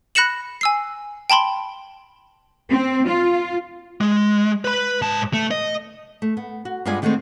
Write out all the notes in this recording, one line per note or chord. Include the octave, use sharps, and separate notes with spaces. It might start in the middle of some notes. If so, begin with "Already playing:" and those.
B5 F#6 A#6 C#7 E7 F#7
G#5 E6 C7
G5 A5 B5 C6
C4
F4
G#3
B4 B5
G#2 A5
A3
D#5
A3
B3
F#4
G2 G#3 B3 F4 D5 G#5
D3 D#3 G#3 A3 B3 C4